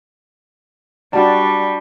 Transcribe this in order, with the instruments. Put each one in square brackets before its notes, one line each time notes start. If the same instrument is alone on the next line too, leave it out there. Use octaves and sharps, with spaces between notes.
[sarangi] G3 [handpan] D4 F#4 D5 [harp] A5